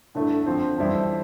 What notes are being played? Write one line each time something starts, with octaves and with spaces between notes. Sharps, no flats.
G2 D3 A3 E4
D3 F3 C4
F2 E3 G3 C4 E4